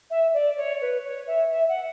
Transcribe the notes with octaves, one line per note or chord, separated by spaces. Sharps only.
E5
D5
C#5
B4
C#5
E5
E5
F#5